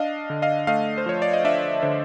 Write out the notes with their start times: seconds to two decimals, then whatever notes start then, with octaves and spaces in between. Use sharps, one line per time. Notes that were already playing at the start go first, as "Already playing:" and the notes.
Already playing: D4 D#5 F5
0.30 D3
0.42 D#5 F5
0.67 A3 D#5 F5
0.98 C5
1.06 F3 C#5
1.22 D5
1.33 D#5
1.44 D4 D5 E5
1.82 D3 C5